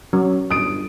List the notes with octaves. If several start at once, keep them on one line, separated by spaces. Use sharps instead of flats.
F#3 C#4
G1 D#6 D7